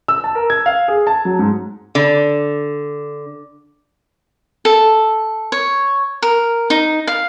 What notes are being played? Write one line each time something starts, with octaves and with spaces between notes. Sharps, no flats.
E6
A5
A#4
G#6
F5
G#4
A5
F#3
G#2
D3
A4
C#5
A#4
D#4
F5